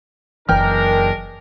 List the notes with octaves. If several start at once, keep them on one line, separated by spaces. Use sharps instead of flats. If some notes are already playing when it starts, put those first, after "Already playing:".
F#1 E3 G#3 D4 A#4 G5 F6